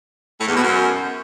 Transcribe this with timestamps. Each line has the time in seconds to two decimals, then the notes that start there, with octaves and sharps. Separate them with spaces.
0.40 A2
0.48 E2
0.55 B2
0.62 F#2